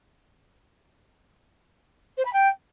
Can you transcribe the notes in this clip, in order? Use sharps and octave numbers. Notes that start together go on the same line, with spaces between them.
C5
B5
G5